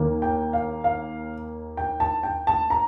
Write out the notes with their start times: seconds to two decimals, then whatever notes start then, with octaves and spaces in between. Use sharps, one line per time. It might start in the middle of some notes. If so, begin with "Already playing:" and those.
Already playing: D#2 D#3 A#3
0.22 G5
0.53 F5
0.84 F5
1.77 G5
2.00 A5
2.23 G5
2.47 A5
2.70 A#5